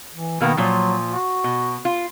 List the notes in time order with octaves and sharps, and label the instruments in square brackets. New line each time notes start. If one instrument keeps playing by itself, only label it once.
[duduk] E3
[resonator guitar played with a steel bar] B2 A#3 B3 [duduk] D#3
[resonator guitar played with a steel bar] A#2 F3 [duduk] F#3
[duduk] F#4
[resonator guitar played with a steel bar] B2
F4